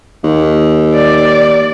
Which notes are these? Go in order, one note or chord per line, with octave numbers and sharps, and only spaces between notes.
D#2
D5